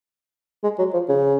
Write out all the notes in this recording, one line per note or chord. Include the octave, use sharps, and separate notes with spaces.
G#3
F#3
F3
C#3